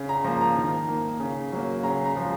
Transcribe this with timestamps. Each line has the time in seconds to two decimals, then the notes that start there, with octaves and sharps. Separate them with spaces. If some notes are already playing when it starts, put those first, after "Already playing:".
Already playing: C#3
0.09 A#5
0.24 F3 A#3 A#5
0.41 A#5
0.57 D#3
0.89 A#3
1.20 C#3
1.53 F#3 A#3
1.83 C#3 A#5
2.05 A#5
2.15 F3 G#3